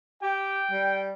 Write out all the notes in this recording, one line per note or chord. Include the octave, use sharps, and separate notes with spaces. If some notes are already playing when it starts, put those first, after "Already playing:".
G4 G5
G3